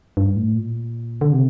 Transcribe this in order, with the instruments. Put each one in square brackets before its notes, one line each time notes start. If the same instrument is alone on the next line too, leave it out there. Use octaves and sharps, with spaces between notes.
[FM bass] G2
A2
A#2
D3
C3